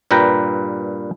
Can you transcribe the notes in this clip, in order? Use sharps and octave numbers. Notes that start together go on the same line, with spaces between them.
G2 A#2 B4 G5 A#5